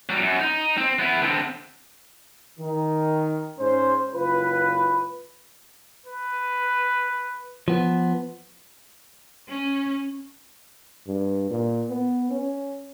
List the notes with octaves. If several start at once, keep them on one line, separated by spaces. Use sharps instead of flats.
F#3 G3
F#2
D#4
C4
B3 E4
D3 C4
D#3
G#2 C#4 C5
F#1 C#2 F4 B4
B4
F3 B3
C#4
G2
A#2
B3
C#4